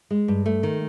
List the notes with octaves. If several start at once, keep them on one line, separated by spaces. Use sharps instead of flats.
G#3
G2
A3
D#3